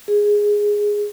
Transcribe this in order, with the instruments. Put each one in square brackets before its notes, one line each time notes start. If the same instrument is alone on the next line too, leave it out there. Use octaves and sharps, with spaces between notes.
[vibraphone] G#4